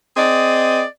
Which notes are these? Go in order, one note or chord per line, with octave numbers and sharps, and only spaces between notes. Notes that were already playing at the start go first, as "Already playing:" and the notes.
C4 G#4 D5 D#5